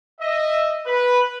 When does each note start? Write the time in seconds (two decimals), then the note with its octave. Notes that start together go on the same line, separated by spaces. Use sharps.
0.21 D#5 E5
0.87 B4